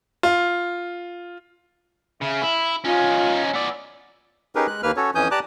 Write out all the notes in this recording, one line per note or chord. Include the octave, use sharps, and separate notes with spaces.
F4
C#3 E5
E4
C#4 D#4 F4
B3 D5 E6
C#4 D#4 G4 G#4 A#4 B4
G#3 F#6
D#2 A#3 B4 F6
C#4 F#4 A4 C#5
F2 E3 C#4 G#5 D#6 G6
G4 D5 A5 A#5 D6 F#6